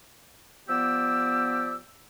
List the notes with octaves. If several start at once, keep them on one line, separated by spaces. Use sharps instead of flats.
F3 B3 G4 D5 E6